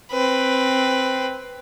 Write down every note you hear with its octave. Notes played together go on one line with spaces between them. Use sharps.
C4 B4